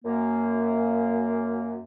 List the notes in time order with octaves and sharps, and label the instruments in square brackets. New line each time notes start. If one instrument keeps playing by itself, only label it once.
[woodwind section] F#2 A#3